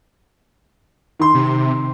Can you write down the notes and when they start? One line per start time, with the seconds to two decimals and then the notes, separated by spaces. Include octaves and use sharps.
1.20 D#3 C6
1.34 C3